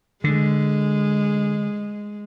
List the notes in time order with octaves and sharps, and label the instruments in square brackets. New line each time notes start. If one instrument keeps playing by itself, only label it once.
[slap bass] D3 [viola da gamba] G#3